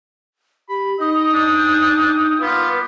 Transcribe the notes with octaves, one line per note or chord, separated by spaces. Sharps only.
G4 B5
D#4 D#5 G5 D#6
D4
G3 A#3 B3 F4 B4